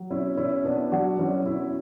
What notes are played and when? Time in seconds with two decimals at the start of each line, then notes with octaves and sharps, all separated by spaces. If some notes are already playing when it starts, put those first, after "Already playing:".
Already playing: F#3
0.10 B2 C#4 E4
0.37 B2 C#4 E4
0.65 B2 B3 D4
0.92 F#3 D4 F#4
1.19 F#3 C#4 E4
1.45 B2 C#4 E4